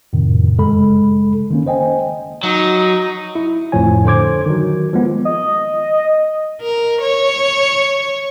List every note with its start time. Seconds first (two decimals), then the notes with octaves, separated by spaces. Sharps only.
0.13 F2 A2 C3 D#3
0.58 G1 F#2 C#3 G#3 A4 B5
1.51 D#3 A#3 C#4
1.66 C5 D#5 G5 G#5
2.43 F#3 D#4
3.35 E4
3.72 G1 F2 A2 F3 C#5 G#5
4.05 D3 A4 C5 D6 G#6
4.46 D#3 F#3
4.93 F3 G#3 B3
5.25 D#5
6.61 A#4
7.02 C#5